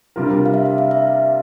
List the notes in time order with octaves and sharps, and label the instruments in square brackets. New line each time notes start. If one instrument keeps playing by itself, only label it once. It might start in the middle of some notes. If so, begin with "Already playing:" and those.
[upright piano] C3 G3 D4 F4 A#4
[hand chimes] F5
E5
E5
F5
E5